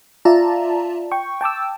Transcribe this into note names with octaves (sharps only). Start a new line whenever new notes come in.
F4 D5 E5 A5 A#5
G5 C#6
G5 A5 D6 E6